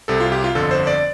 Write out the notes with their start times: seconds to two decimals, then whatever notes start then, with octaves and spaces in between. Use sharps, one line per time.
0.08 C2 C3 A4
0.20 F4
0.32 G4
0.44 F4
0.55 G1 F2 D3 A4
0.71 C5
0.87 D5